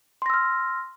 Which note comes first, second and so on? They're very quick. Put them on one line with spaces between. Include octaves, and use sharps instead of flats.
C6 A#6 E6 F6